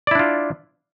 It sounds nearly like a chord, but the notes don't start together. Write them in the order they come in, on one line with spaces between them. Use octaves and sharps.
D5 E4 D4 F4